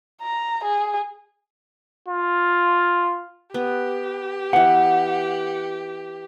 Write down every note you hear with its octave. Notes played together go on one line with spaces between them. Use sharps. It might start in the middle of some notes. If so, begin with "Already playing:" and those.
A#5
G#4
F4
B3 G4
E3 B3 F#5